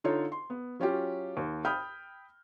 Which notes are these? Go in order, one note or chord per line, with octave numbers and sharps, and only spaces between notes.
D3 D#4 F4 A4 C#5
C6
B3
F#3 C#4 F4 G4
D#2
G5 B5 D#6 F6 G6